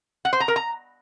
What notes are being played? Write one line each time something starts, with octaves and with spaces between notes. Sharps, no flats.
F#5
C5
A#5
A#4
A#5